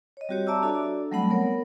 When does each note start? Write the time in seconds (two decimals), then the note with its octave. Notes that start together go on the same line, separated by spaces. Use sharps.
0.17 C#5 D#5
0.29 G3 C4 F#4 G4 C#5
0.47 D5 E5 A5 A#5 D6 E6
0.62 D4 F#4 A4 D5
1.11 F#3 G3 A3 C4 F#5 B5
1.30 B3 A#4 C#5